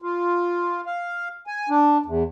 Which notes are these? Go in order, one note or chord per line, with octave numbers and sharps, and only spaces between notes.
F4
F5
G#5
D4
E2